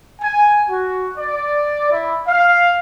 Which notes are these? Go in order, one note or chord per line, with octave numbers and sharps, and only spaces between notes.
G#5
F#4
D5
E4
F5